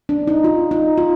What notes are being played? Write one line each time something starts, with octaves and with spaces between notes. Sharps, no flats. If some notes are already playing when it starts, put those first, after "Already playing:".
D4
D#4
F4
D#4
F4